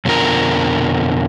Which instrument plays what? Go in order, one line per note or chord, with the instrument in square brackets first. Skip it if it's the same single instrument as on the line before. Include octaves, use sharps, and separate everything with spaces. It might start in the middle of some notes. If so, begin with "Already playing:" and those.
[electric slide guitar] F2 B2 D3 F3 A#4